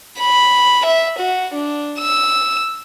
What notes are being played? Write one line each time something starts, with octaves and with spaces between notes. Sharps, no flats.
B5
E5
F#4
D4
E6